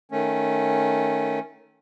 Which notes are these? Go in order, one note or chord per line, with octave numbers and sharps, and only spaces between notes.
D#3 A3 C#4